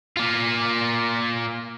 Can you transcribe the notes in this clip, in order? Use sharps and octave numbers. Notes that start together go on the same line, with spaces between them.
A#3 F4